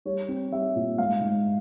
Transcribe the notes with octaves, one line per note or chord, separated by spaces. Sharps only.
G3 C#5
C4
G3 E5
A#2
G#2 F5
G#2